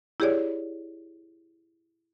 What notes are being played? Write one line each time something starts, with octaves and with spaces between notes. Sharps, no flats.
E4 G4 G#4 C#5 D5